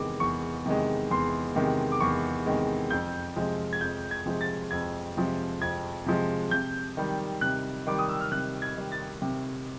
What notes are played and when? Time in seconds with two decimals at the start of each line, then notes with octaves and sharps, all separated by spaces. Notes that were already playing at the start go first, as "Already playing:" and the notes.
Already playing: E2 C3 D#3 G#3 D6
0.20 E2 C#6
0.66 C3 D#3 G#3
1.10 E2 C6
1.56 C3 D#3 G#3
1.92 D6
2.01 E2 C#6
2.46 C3 D#3 G#3
2.90 F2 G6
3.36 C3 F3 G#3
3.73 G#6
3.81 F2 G6
4.11 G#6
4.26 C3 F3 G#3
4.41 A6
4.71 F2 G#6
5.17 C3 F3 G#3
5.61 F2 G#6
6.06 C3 F3 G#3
6.51 C3 G6
6.97 D#3 G3
7.41 C3 F#6
7.87 D#3 G3 D6
7.99 D#6
8.09 E6
8.21 F6
8.32 C3 F#6
8.62 G#6
8.77 D#3 G3
8.92 A6
9.22 C3